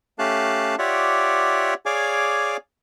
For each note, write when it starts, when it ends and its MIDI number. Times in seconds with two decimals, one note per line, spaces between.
0.19 0.75 57
0.19 0.75 61
0.19 0.75 67
0.19 0.75 77
0.19 0.75 81
0.19 0.75 90
0.79 1.74 65
0.79 1.74 67
0.79 1.74 73
0.79 1.74 74
0.79 1.74 76
0.79 1.74 78
1.86 2.57 68
1.86 2.57 73
1.86 2.57 74
1.86 2.57 77
1.86 2.57 80
1.86 2.57 86